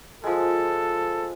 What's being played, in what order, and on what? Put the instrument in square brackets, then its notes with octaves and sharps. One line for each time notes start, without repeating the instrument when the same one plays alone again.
[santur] F3 G#3 [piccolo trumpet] A4